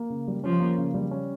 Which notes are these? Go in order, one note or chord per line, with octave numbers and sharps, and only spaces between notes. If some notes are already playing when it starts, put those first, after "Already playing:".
Already playing: A#3
C#3
G3
F3 C#4
A#3
C#3
G3
C#4